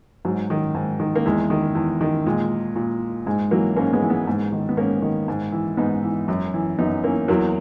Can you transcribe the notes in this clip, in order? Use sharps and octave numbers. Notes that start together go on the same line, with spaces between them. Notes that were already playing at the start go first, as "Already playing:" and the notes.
G#2 F#3
D#3
G#2
D#3
A#3
E2 G#3
D#3
E2
D#3
A#2 G#3
A#2
G#2 G#3
E3 F#3 A#3
G#2 A#3 C#4
G#3 B3
E3
G#3 B3
G#2
D#3
B3
G#2 A#3 C#4
D#3
G#2
E3
G#2 B3 D#4
E3
F#2
E3
F#2 B3 D#4
E3 A#3 C#4
E2 F#3 A#3